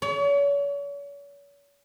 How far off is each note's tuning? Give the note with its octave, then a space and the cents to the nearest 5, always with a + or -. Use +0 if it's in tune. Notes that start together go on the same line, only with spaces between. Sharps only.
C#5 +40